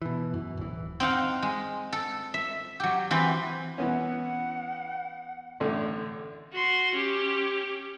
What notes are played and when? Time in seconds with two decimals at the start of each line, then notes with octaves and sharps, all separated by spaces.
0.02 B2 E3
0.34 F#2
0.57 D1 E3
1.00 C4 D#4 F5 F#5
1.42 G#3
1.93 A4
2.34 E5
2.80 F#3 G4
3.11 E3 C4 B4
3.78 E3 B3 C#4 F#5
5.60 A1 A2 D3
6.53 F#4 C6
6.94 C#4 G4